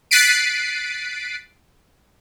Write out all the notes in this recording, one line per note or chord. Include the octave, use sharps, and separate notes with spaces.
F#6 A6 B6 C7 D7 D#7